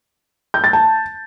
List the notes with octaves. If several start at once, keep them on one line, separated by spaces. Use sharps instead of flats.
G6
A6
A5